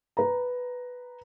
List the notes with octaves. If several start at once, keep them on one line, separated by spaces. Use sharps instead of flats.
B4 A#5